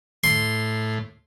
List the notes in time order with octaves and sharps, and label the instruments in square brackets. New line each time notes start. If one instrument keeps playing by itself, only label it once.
[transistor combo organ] A2 [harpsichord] C6